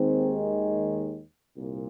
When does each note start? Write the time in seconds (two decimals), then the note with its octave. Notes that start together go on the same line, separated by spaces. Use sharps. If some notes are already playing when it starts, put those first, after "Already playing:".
Already playing: D#2 D#3 G#3 C4
1.56 C2 A#2